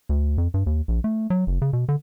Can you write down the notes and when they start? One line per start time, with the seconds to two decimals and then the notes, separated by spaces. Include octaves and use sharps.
0.09 D2
0.38 F2
0.54 G2
0.66 D#2
0.88 A#1
1.04 A3
1.30 F#3
1.47 F#1
1.62 C#3
1.73 B2
1.89 D3